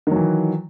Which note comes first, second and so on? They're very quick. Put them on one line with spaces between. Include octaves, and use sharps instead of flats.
D#3 F#3 E3